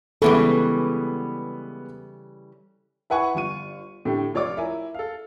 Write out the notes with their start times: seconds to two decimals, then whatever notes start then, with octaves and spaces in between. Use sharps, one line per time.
0.22 C#3 E3 G3 G#3 B3 A4 B5
3.10 E4 B4 F#5 G#5 C#6
3.35 G1 F4 C#6 D#7
4.05 A2 D3 A3 G4
4.34 F1 F4 C#5 D5 D6
4.57 E4 A#4 G#5
4.94 A4 F5